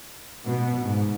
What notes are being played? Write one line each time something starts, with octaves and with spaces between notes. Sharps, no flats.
B2
G#2